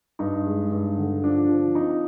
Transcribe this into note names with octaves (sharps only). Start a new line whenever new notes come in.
G2 D#4
G#3
G2
D3
F3 D4
F3
C4 D#4